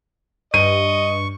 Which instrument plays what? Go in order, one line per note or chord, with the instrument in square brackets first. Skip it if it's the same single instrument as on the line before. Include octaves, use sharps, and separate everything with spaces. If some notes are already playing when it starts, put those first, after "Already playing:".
[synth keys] G2 [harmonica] D#5 [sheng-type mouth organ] C#6 [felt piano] D#7